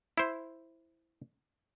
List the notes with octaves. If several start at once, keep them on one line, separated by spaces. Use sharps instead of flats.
E4 C5